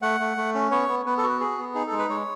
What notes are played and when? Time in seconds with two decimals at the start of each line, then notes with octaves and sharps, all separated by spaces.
0.02 A3 F#5
0.20 A3
0.37 A3
0.55 C#4
0.71 B3 C#5
0.88 B3
1.06 B3 B4
1.18 A4
1.23 F#4
1.29 B4
1.40 G#4
1.58 B3
1.75 D#4 G#4
1.87 A4
1.92 G#3
1.98 B4
2.09 G#3 C#5